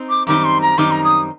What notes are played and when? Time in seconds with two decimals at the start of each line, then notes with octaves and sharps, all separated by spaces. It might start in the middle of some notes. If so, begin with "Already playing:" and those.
Already playing: C4 D#4
0.09 D6
0.27 F#2 D#3 G3 C4 D#4 D6
0.45 C6
0.61 A#5
0.78 F#2 D#3 G3 C4 D#4 D6
0.91 A#5
1.04 D#6